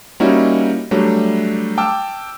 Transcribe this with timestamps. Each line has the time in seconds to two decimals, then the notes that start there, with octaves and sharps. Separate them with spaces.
0.20 G3 A#3 C#4 D#4 E4 F#4
0.91 F#3 G3 A3 D4
1.78 G5 A5 D6 E6 F6